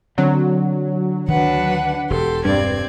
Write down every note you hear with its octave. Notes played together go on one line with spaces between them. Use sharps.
D3 F#3 C4
D2 D#3 D4 B4 F#5
E1 G4 A4 C6
G2 C4 D5 G#6